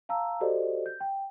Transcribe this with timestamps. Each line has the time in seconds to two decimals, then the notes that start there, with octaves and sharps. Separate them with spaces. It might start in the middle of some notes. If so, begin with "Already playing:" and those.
0.09 F5 A5 A#5 E6
0.41 F#4 G4 A4 C5 D5 D#5
0.86 G6
1.00 G5